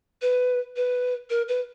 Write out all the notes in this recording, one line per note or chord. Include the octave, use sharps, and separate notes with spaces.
B4
B4
A#4
B4